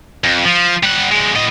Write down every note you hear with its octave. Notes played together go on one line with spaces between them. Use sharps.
F2
F3
G3 F#5
D2 G#3
A2 D#5